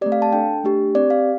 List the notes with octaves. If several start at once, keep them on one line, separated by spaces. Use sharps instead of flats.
A3 C4 G4 D5
F5
A5
D4 A4 G5
A3 D4 G4
C4 G4 D5
F5